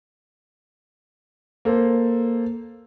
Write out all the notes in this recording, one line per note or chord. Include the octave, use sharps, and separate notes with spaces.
A#3 A4 C5